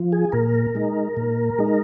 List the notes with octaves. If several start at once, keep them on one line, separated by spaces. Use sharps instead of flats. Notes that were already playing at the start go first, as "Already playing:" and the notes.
Already playing: F3
G#4
A#2 A#4
G#3 D#4
A#2
G#3 D#4